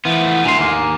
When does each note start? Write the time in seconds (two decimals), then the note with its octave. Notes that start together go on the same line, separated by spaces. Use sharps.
0.05 E3 F3 A3 B3
0.45 D2 D3 G#5 A#5 C6
0.59 D#2 A#3